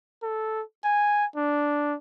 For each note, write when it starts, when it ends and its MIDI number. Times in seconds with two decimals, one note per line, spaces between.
0.23 0.63 69
0.84 1.25 80
1.36 1.96 62